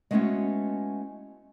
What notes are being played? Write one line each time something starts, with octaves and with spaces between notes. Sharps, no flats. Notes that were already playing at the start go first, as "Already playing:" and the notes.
G#3 A3 B3 C#4 E4 F#4